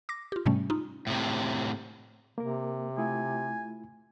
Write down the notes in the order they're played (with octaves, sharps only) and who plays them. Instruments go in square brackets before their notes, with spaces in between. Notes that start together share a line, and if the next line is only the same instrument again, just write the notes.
[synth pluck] D6 A#6
F4 G4
G#2 C3 G3 A3 C#4
D#4 F4
[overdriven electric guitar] A2 C3
[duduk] C3 [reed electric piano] A#3 A#4
[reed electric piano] A3 E4 F4 [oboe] G#5